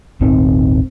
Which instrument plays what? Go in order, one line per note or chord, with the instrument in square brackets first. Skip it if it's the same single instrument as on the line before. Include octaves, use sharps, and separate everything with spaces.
[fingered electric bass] D#1 G#1 D#3 C4